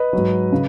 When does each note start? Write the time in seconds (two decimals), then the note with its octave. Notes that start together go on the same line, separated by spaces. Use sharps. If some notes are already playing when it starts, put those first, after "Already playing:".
Already playing: B4 D#5
0.13 G#2 F#3
0.52 C#3